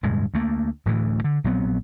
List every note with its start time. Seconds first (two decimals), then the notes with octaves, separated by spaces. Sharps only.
0.03 D1 G2 B2 G#3
0.34 D2 A3 A#3
0.86 D1 D2 A2 E3
1.24 D3
1.44 A#1 F#3 B3 C4